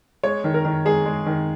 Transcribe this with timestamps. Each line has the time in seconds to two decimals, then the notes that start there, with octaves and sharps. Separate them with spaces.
0.24 G#3 C#5
0.44 D#3
0.54 A#4
0.65 D#3
0.85 G#3 G#4
1.06 G#3
1.26 D#3